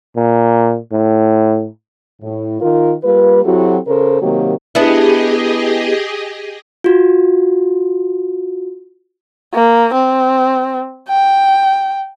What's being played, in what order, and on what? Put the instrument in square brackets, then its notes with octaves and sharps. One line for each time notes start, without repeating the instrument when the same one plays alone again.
[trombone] A#2
A2
[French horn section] A2
D#3 F4 A#4
G3 A#3 F4 B4
F#3 C4 E4 F#4 G4 A4
C#3 A4 A#4 C5
C3 D#3 F#3 A#3 F#4 G4
[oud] B3 D4 E4 [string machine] G4 G#4 D#5
[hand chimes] F4 F#4
[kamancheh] A#3
C4
G5